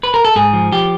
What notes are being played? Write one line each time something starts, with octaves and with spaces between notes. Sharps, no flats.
B4
A#4
A4
G#2 G#4
F3
F3 G4